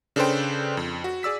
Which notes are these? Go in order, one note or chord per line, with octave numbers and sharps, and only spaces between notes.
C#3 D4 A4 B4 C5 G5
F2
F#4
G#4 D5 E6 B6